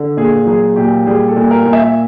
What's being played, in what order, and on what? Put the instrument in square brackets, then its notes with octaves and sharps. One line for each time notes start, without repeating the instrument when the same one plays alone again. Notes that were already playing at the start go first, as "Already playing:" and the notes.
Already playing: [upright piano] D3
A#2 G#4
F#3 G#4
A#2 G4
G3 G#4
A4
A#2
A#4
A#2
E5